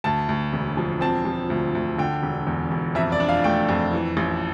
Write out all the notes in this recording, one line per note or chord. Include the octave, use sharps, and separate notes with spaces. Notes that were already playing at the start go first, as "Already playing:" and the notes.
D2 A5
D2
E1
F3
C4 A5
F3
D2
D2
D3 G5
E1
E2
E1
F2 E5
D5
D4
F5
A3 G5
F2
E3
A1